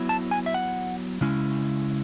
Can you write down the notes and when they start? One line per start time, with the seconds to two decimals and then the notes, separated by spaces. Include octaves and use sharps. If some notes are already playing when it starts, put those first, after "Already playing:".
Already playing: F#3 B3 E4
0.09 A5
0.31 G#5
0.46 E5
0.54 F#5
1.21 C#3 G#3 C#4 E4